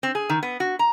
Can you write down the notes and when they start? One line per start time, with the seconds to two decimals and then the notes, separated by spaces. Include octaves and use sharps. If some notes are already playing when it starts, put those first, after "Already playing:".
0.03 C4
0.15 G#4
0.29 D#3
0.43 B3
0.60 F#4
0.79 A#5